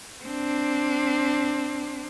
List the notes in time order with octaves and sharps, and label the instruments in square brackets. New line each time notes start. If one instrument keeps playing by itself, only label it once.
[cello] C4 D4